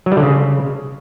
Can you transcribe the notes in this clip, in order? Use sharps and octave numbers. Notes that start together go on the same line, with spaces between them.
F#3
G3
D3
C#3